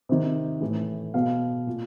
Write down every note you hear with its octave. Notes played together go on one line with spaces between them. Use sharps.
C3 D#3
A2 E3
B2 F5
A#2